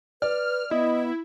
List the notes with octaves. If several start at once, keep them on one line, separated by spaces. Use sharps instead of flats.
B4 D5 F6
B3 E4 D#5